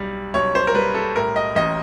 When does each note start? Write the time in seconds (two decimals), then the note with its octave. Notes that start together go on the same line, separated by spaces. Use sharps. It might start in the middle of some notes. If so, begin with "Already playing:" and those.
Already playing: B1 G3
0.34 B1 C#5
0.55 C5
0.67 A#4
0.75 G3 B4
0.94 A4
1.15 A2 A#4
1.36 D#5
1.55 A1 D#5